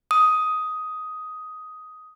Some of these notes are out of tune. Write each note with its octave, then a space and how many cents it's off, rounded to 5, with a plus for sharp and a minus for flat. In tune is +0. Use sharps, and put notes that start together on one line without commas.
D#6 +10